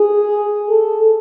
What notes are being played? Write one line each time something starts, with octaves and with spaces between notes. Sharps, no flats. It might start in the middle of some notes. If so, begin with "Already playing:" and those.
Already playing: G#4
A4